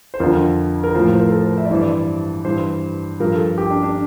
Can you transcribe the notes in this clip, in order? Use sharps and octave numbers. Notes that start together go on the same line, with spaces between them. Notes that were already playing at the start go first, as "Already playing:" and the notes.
C5
F2 D3 F3 A#4
A#4
A2 F3 C5
A#4
C5
A#4
A4
A#4
C5
E5
D5
G2 E3 C5
D5
G2 E3 C5
G2 F3 A#4
A4
G4
D4
D4